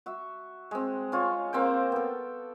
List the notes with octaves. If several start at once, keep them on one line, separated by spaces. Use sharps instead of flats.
F#4 E5
G#3 C4
C#4 F4 C#5
A#3 C4 C5 G5
B3 A4